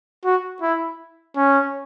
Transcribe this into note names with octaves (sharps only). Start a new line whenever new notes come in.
F#4
E4
C#4